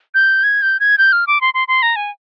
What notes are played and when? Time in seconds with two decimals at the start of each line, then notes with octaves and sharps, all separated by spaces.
0.15 G6
0.44 G#6
0.62 G6
0.80 G#6
0.98 G6
1.12 F6
1.27 D6
1.41 C6
1.54 C6
1.68 C6
1.82 A#5
1.96 G#5